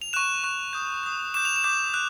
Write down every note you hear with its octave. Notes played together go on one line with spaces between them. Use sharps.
F7
C#6 F#6 E7
C#6 F#6
D#6 G6
D#6 G6
D6 G6 E7
F7
E7
D6 G6
F#6